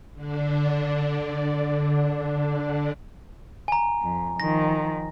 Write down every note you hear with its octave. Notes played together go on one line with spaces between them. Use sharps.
D3 D4
G#5 A#5
F2
D#3 F3 A#6